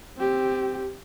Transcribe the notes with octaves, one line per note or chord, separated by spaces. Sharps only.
C4 G4